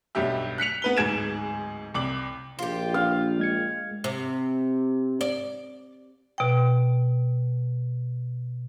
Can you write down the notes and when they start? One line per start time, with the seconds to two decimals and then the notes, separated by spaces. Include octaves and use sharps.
0.15 B1 G2 G4 E5
0.58 F#6 B6 C#7 F7
0.82 B3 B4 G7
0.97 D1 G#2 G#4 G#6 D7 E7
1.94 C2 D6 F#7
2.59 A#1 F4 G4
2.94 F5
3.39 G#3 G#6 C#7
4.04 C3
5.21 D5
6.38 B2 G5